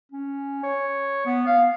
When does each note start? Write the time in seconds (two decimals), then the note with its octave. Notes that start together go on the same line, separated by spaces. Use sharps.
0.12 C#4
0.63 C#5
1.26 B3
1.46 F5